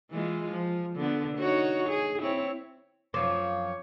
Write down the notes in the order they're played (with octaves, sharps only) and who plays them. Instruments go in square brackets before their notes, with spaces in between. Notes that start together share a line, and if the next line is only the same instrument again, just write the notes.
[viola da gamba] E3 G#3 F4
F3
D3 B3
D#4 F#4 C#5
G#4
C4 E4 C#5
[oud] F#2 F3 C4 [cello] C#5 [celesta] D6